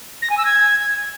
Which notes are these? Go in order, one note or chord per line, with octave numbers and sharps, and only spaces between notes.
A#6
G#5
E6
G#6